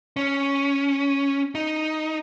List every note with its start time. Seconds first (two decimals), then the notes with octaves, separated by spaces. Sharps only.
0.17 C#4
1.55 D#4